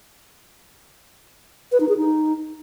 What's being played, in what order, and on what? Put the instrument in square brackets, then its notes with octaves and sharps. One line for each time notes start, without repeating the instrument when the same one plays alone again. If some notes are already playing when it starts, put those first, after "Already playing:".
[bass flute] B4
D#4
G#4
D#4